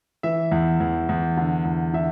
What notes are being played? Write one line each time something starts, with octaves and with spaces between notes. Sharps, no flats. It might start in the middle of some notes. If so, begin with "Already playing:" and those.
E3 E5
E2
E2
E2
D3
E2
D3 E5